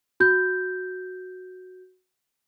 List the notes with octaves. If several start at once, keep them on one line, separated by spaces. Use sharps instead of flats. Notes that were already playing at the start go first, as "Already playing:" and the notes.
F#4 G6